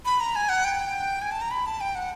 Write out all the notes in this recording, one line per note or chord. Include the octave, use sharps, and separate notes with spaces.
B5
A#5
G#5
F#5
G5
G#5
A5
A#5
B5
A5
G5
F#5